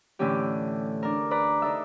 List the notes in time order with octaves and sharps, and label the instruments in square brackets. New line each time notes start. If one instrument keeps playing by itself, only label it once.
[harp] A2 D3 E3 A3 C#4 G4
D4 A#4
B4 D5 A#5
D4 D#4 A4 E5